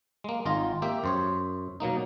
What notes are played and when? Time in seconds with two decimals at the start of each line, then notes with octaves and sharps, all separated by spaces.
0.24 G#3 A#3
0.45 G#1 D#4 F4 A#5
0.82 A#3 G4 E5
1.04 F#2 C5 C#5
1.80 B2 F#3 A#3 D#4